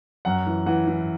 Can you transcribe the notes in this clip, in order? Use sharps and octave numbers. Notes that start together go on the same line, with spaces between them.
F#2 F#5
E3
E3 F#5
E3